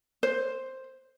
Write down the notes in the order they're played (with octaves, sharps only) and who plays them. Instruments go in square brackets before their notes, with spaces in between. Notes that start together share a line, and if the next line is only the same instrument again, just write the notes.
[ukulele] C5